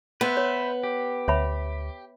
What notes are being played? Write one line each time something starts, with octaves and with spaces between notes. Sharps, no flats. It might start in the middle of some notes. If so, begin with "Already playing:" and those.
B3 B4 C5 E5
C#5
G4
D2 C#5 E5 B5